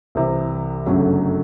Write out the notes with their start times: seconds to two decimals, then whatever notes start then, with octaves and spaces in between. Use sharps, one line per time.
0.15 C2 C3 E3
0.86 G1 F#2 C#3 F#3 A3